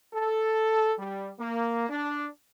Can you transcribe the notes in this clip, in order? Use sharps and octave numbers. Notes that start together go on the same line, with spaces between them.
A4
G3
A#3
D4